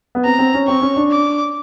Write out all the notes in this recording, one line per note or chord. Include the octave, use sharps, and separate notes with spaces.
B3
C4 A#5
C4
C#4
C4 C#6
C#4
D4
D6